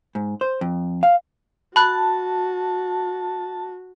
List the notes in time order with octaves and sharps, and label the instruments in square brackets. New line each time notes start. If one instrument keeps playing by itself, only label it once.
[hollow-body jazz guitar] G#2
C5
F2
F5
[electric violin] F#4 [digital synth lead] A5 [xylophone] B5 F#6